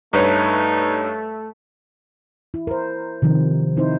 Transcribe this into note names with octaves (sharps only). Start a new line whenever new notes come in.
G2 A3 D#4 B4 C#5
E4
A#4 C5
C3 D#3 F3
C4 D#4 E4 C5